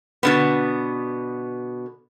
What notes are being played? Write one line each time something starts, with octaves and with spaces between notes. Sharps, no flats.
B2 D3 B3